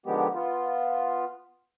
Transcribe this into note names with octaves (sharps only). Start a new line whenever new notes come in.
D3 D#3 F3 G#3 B3 G4
B3 F4